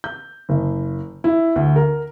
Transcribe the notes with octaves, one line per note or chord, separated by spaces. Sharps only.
G6
F#1
E4
D2
A#4